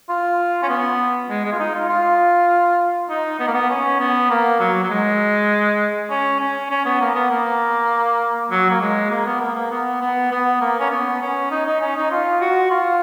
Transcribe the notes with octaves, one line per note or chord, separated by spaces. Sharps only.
F4
C#4
B3
G#3
G#3
F4
D#4
F4
F4
D#4
B3
A#3
B3
C#4
B3
A#3
F#3
F#3
G#3
C#4
C#4
C#4
B3
A#3
B3
A#3
F#3
A#3
G#3
A#3
B3
A#3
A#3
B3
B3
B3
A#3
C#4
B3
C#4
D#4
D#4
C#4
D#4
F4
F#4
F4